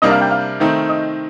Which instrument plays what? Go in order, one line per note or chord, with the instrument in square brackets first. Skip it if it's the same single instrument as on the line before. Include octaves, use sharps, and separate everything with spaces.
[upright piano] C3 G3 A#3 D4 [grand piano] D#5 D#6
[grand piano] F5 F6
G5 G6
F5 F6
[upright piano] D#3 A3 C4 D#4
[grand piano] D#5 D#6